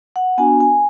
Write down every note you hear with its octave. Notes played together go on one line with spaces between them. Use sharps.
F#5
B3 D4 F#4 G#5
G#5